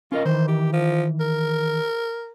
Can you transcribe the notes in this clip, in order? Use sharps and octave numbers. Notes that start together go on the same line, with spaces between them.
C#4 F4 A#4 D#5
D#3 E3 C5
G4
F3
A#4